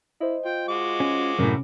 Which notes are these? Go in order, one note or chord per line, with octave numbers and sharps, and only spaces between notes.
E4 C5 D#5
F4 G5
G#3 F#4 D6
C#4
F#2 A2 C3 C#4 A#4